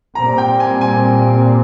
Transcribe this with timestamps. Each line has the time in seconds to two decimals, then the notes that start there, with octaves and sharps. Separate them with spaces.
0.15 A#2 G3 C4 A#5
0.38 G5
0.60 G#5
0.81 G#5